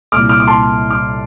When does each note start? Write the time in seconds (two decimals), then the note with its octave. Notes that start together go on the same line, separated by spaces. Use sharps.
0.12 A#2 D6 F6
0.16 C2
0.29 D6 F6
0.40 D6
0.47 A5 C6
0.90 D6 F6